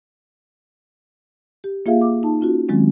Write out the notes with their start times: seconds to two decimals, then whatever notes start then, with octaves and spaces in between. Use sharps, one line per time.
1.64 G4
1.86 A#3 F4 G#4 E5 F5
2.01 D6
2.23 D#4 A5
2.41 C#4 F4 F#4
2.69 D#3 F#3 G#3 C4 C#4